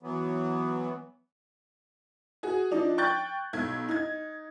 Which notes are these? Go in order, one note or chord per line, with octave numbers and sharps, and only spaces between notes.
E3 F#3 B3
F#4 G#4
F3 D4 D#4
G5 C#6 F#6 G6 A6
B1 G#6
D#4 G#6